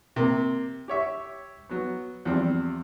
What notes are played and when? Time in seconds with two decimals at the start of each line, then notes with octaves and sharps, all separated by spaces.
0.16 C3 A#3
0.88 G4 C#5 E5
1.69 F#3 B3
2.25 E2 F3 G3 C4